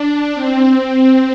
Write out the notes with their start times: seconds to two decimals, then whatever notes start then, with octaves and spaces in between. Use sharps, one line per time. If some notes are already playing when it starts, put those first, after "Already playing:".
Already playing: D4
0.35 C4